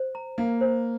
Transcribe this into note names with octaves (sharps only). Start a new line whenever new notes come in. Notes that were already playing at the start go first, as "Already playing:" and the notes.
Already playing: C5
A#5
A#3 F5
C5